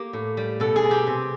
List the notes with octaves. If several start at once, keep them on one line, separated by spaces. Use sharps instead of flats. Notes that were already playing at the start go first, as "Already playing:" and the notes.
Already playing: A#3 G4
A2
G3
B2 A4
G#4
B2
G4
C3